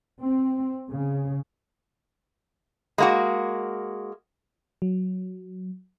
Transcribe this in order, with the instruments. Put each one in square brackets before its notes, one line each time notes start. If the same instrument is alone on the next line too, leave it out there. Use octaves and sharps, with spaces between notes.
[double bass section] C4
C#3
[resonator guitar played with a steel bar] G#3 A#3 F#4
[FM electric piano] F#3